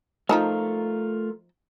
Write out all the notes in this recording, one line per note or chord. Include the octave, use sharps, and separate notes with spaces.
F3 A3 D#4 F4 A#4 A5